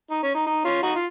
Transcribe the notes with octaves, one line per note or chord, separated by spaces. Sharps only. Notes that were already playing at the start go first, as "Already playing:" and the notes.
D#4
C#4
D#4
D#4
C#4 F4
D#4 F#4
F4